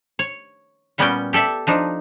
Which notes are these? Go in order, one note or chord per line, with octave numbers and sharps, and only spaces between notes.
C#5
A#2 G3 B3 C#4 F#4 G5
G4 A4 D5 E5
F3 D4 D#4